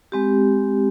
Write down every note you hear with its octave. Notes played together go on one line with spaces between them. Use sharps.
G#3 C4 G4